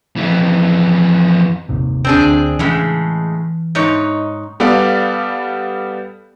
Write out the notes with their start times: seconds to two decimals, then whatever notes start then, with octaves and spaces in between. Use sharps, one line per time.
0.16 F2 E3
1.69 G1 D#2 C3
2.05 C4 D4 G#4
2.18 D2
2.59 A2 C#3 E3 G#3
3.75 G#2 D#4 C#5
4.60 G3 B3 G4 A4 D5 F5